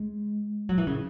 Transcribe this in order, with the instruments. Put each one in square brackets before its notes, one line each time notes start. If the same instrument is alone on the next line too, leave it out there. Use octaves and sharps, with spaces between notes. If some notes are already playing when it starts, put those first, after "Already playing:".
Already playing: [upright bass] G#3
F#3
E3
C#3